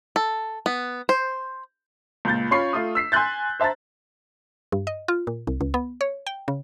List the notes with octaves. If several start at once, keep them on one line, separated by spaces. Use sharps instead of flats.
A4
B3
C5
C#2 A#2 G6 A6
C#4 F4 C#5 B5 C#6 C7
A3 F4 D#6
E6 B6 C7
G#5 C6 E6 F#6 G6 A6
C5 E5 A5 A#5 A6
G2
D#5
F4
A#2
C2
C#2
B3
C#5
G5
C#3